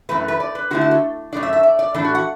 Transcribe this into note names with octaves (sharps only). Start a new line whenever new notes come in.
F#2 E3 A3 B4
B4
D5
B4
D3 A3 E4 F#4
F#4
A4
F#2 D3 A3 D4 D5
E5
E5
D5
D5
A2 E3 D4 A4
F#4
F#5